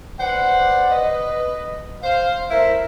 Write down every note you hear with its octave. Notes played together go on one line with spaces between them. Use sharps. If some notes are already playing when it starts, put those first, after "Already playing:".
B4 C5 D5 F#5
B4 D#5
C5 F5
A3 E4 A#4 C5 E5